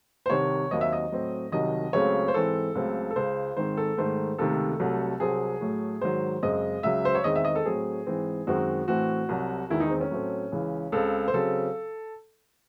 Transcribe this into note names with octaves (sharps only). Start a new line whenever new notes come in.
C5
C2 C3 D#3 C#5
D#2 D#3 F#3 C4 D#5
E5
D#5
A2 F#3 C4
C2 C3 D#3 F#3 D#5
C#2 C#3 F#3 A3 C4 C#5
C5
G#2 E3 C4 A4
C#2 C#3 F#3 A3 C4
A4
C#2 C#3 G#3 C5
G#2 D#3 G#3 C4 C5
A4
G#2 D#3 A3 C5
C#2 C3 D#3 A3 A4
C2 C3 F#3 A3
C2 C3 F#3 C4 G#4
A2 F#3 A3
G#2 D#3 F#3 C5
F#2 C#3 G#3 C4 D#5
C#2 C#3 F#3 E5
C5
C#5
E2 D#3 G#3 C4 D#5
E5
D#5
A4
A2 F#3 C4 G#4
G#2 E3 C4
F#2 D#3 G#3 C4 F#4
A2 E3 A3 C4 F#4
C2 C3 F#3
E2 D#3 G#3 E4
D#4
C4
C#4
A2 F#3 A3 C4
C#2 C#3 E3
C#2 C#3 G#3 C4 A4
C5
C#3 F#3 C4 A4